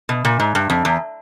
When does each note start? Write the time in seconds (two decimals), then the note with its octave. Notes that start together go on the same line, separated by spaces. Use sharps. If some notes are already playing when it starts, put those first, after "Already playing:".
0.09 B2
0.25 A#2
0.40 G#2
0.55 G2
0.70 F2
0.85 E2